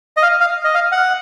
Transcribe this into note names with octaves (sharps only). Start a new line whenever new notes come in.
D#5
F5
F5
D#5
F5
F#5